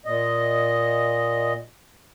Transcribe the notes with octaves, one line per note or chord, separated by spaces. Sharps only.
A#2 D#5